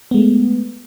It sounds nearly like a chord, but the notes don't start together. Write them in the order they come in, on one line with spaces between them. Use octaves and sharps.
B3 G#3 A3